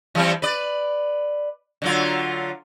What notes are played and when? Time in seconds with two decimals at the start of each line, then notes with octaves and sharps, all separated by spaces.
0.15 E3 G3 C4
0.42 B4 D5
1.82 D3 F#3 F4